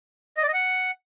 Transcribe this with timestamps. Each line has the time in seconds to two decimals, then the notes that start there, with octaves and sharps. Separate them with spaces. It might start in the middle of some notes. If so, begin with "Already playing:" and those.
0.37 D#5
0.43 D5
0.48 D#5
0.54 F#5